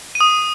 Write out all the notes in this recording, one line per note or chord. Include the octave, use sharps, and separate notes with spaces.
D#7
D#6
D#7